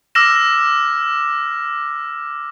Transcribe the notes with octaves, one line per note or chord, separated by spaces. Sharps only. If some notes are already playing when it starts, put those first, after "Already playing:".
D6 E6 F6 A#6 E7